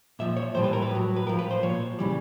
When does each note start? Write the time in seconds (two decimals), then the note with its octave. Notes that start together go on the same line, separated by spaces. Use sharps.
0.19 A#2 F3 E5
0.37 C#5
0.54 A2 E3 G3 C5
0.64 B4
0.73 A#4
0.82 B4
0.91 A2 F#3
1.16 B4
1.26 A2 F3 A#4
1.39 B4
1.51 C5
1.63 A#2 F3 C#5
1.99 C#3 E3 G3